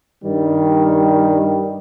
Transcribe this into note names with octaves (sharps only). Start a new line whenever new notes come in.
G2 D#3 G3